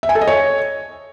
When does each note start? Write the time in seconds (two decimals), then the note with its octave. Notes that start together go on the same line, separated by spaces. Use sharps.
0.03 E5
0.09 G#5
0.15 A4
0.21 D#5
0.27 C#5